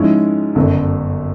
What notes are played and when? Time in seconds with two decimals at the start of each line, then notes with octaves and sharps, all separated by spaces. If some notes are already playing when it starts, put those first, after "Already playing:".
Already playing: G#2 F3 G#3 C#4 E4
0.55 G1 F#2 D3